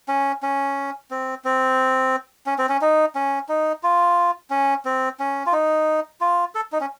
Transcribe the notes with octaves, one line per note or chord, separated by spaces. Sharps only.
C#4
C#4
C4
C4
C#4
C4
C#4
D#4
C#4
D#4
F4
C#4
C4
C#4
F4
D#4
F4
A4
D#4
C#4